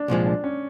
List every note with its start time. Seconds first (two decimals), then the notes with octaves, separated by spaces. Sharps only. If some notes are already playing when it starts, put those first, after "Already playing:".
Already playing: D4
0.08 C2 A#2 F3 G#3
0.26 D4
0.44 C#4